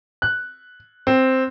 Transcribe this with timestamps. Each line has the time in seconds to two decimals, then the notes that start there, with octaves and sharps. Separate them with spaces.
0.22 F#6
1.07 C4